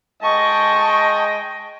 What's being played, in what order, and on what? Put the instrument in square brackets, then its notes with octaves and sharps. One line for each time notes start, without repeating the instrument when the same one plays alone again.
[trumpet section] G#3 D#5 G5 [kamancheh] A5 C#6